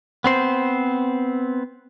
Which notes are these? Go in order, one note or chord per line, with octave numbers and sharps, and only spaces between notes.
B3 C4 C5